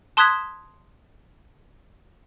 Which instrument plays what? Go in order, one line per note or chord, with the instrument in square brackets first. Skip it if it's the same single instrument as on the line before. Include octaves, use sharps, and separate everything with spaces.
[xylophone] A5 C6 D#6 F#6 G#6 B6